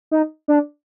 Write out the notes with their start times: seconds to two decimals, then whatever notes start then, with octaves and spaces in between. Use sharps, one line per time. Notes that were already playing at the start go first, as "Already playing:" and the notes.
0.11 D#4
0.48 D4